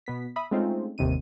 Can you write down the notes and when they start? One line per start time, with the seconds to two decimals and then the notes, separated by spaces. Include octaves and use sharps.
0.06 B2 B3 B6
0.36 E5 B5 D#6
0.51 G#3 A3 C4 C#4 D#4 F4
0.98 G1 D#2 C3 D#3 D#7